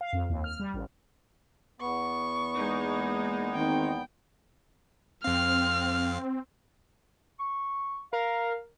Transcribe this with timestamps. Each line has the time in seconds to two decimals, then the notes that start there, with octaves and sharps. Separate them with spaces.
0.01 F5
0.13 F2
0.30 D#2
0.44 F6
0.60 G3
0.74 A1
1.80 E2 B3 C#6
2.55 G#3 A#3 D#4
3.54 D#3 C4 G5
5.24 F2 C4 F5 F6
7.39 C#6
8.13 A#4 F5